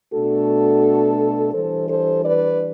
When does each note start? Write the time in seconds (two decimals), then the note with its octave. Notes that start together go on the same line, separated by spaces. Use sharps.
0.13 B2 A3 D4 F#4 A4
1.53 E3 G3 D4 A4 C5
1.89 A4 C5
2.24 B4 D5